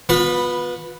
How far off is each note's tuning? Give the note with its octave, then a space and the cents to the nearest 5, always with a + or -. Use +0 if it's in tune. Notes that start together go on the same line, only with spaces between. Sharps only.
B3 -10 F4 +40 B5 +0